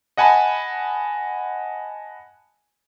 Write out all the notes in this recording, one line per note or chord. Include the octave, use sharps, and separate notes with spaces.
D#5 F#5 G#5 A5 B5